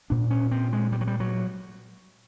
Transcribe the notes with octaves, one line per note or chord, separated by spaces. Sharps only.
A#2 D4
C#4
C4
G#3
G3
F#3
G3
F#3